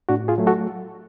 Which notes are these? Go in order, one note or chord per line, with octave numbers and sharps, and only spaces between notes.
A2 D4 F#4
F4 G#4
F#3 A3
F#4 A4